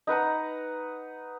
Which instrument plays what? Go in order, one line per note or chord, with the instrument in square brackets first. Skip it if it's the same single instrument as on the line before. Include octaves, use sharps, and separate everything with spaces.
[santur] D#4 B4 F#5 A#5